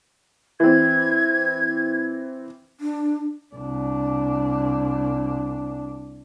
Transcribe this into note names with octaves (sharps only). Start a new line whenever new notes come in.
E3 C4 G#6
D4
C2 D4